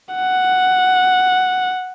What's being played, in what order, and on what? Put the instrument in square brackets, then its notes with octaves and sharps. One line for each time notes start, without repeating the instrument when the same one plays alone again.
[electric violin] F#5